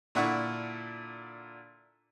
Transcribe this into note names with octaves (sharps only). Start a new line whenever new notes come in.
A#2 D3 D4 E4 F#5 C#6